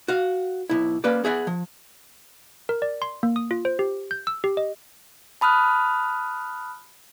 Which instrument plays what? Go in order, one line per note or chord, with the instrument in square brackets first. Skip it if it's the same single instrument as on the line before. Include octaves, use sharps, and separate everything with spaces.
[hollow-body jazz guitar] F#4 F5
B1 E4
A#3 C#4 B4 D5
B3 G#4 E5 F#5
F3
[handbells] A#4
D5
C6
A#3
D#6
F4
C5
G4
G6
E6
G4
D#5
[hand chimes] A5 B5 D#6 F6 F#6